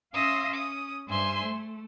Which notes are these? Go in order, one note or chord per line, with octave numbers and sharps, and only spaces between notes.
C#4 E5 F5 C6 D#6 A#6
C#4 D#6
G2 C5 E5 G#5 C6
A3